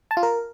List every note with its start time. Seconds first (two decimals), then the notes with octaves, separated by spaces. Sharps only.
0.11 A5
0.17 F4
0.23 A#4